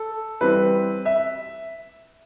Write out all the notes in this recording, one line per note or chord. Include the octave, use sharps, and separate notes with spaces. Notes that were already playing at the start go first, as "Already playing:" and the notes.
Already playing: A4
E3 G3 C4 B4
E5